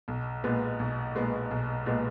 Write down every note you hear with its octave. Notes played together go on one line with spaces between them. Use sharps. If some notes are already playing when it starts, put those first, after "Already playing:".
B1
A#2 G#3 B3
B1
A#2 G#3 B3
B1
A#2 G#3 B3